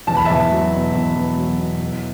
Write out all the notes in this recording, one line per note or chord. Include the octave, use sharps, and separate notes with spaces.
E2 A5
B5
E2 E5 A5
F#3
B2
E2
E2
F#3
B2
E3